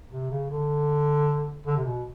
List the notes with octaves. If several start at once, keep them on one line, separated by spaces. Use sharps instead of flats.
C3
C#3
D3
D3
C3
B2